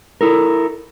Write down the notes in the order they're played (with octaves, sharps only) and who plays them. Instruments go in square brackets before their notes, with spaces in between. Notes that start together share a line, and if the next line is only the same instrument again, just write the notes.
[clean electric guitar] E4 A4 A#4